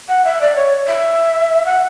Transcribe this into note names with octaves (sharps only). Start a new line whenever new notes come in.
F#5
E5
D5
C#5
E5
F#5